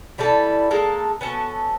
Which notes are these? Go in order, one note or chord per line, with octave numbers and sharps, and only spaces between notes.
E3 G3 E4 A4
G#3 A#3 A4
B3 C#4 F#4 A4